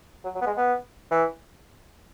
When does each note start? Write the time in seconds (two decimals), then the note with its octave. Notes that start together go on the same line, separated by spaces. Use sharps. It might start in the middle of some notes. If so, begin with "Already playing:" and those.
0.25 F#3
0.35 F#3
0.42 B3
0.47 G#3
0.57 B3
1.11 E3